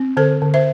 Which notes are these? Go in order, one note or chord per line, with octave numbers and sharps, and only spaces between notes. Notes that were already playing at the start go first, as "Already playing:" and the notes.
Already playing: C4
D3 A4 C5
D3
C5 E5